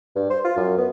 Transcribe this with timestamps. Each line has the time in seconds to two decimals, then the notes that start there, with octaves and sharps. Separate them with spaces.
0.16 G2
0.30 C5
0.44 F4
0.56 F#2
0.78 B3